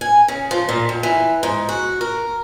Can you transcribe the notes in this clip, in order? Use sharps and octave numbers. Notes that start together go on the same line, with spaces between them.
G#5
C#3
F3
A#2
F2
E3
G#2
F#4
A#4